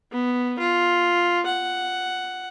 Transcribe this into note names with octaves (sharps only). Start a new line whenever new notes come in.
B3
F4
F#5